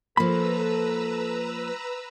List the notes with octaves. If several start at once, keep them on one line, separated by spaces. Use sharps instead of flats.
F3 A#3 A4 B4 A#5 B5 E6